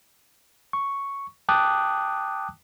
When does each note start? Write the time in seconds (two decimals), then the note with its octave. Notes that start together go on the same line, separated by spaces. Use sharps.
0.73 C#6
1.49 G5 A5 D6 D#6 F#6